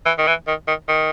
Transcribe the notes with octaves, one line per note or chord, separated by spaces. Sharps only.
E3
D#3
E3
D#3
D#3
D#3